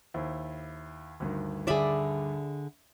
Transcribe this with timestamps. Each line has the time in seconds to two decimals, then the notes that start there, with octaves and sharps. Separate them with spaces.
0.14 D#2 E4 C5
1.20 D2 G2 D#3
1.67 D3 G#4 D5 E5 B5